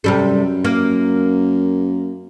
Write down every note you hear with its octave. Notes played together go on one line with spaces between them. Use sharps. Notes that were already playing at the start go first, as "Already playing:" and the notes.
F#2 C3 G3 A4
A#3